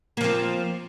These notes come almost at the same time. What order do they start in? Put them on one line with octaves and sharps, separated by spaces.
A#3 F3 C4